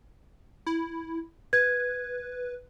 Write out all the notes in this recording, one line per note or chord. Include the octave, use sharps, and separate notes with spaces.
E4
B4 G#6